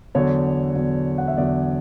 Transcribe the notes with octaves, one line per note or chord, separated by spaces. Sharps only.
E2 D3 F#3 C#5
E2 D3 F#3
F#5
E5
E2 D3 F#3 D5